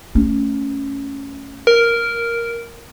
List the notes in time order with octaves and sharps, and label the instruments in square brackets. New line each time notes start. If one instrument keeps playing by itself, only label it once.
[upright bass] A3 C#4
[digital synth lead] A#4